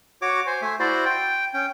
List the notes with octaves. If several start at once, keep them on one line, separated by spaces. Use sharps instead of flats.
F#4 C#5 D6
C5 G#5
A3 E5 G#5
E4 F#4 C5 D5
G5
C#4 G5